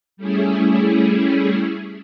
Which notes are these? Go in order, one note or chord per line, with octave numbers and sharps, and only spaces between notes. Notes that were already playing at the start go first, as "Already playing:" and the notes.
G3 A3 C#4 E4 G#4